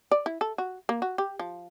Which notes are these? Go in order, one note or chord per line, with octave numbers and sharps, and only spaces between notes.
D5
E4
A4
F#4
A#3
F#4
G4
F3